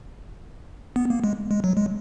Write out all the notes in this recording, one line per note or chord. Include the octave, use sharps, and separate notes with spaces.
B3
A#3
G#3
G#3
F#3
G#3